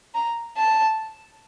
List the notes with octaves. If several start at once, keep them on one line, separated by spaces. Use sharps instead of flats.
A#5
A5